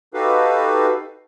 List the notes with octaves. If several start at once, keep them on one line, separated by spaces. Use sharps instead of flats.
D#4 F#4 G4 A4 B4 F5